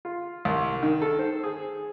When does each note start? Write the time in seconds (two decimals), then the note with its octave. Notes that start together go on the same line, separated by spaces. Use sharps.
0.05 F4
0.45 C2
0.83 D#3
1.02 A4
1.19 C5
1.44 G#4